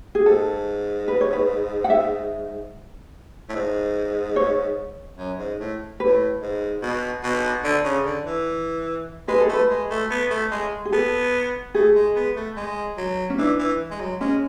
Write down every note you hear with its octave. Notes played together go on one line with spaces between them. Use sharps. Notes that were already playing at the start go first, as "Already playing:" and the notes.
G#4
G#2 A4
B4
C#5
B4
F#5
E5
A2
G#2
C#5
F#2
G#2
A2
A2 B4
G#2
B2
B2
D3
C#3
D3
E3
G#3 B4
A4
A3 B4
G#3
A3
B3
A3
G#3
G#4
B3 A4
A3 G#4
G#3
B3
A3
G#3
F#3
C#4
E3 D4
E3
G#3
F#3
G#3 C#4